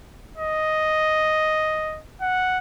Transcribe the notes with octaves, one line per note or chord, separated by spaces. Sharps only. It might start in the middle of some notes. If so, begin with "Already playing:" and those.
D#5
F#5